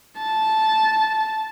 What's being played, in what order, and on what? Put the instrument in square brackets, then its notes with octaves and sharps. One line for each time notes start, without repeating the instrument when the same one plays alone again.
[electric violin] A5